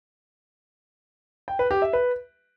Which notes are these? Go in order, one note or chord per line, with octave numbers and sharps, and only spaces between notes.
G5
B4
G4
E5
B4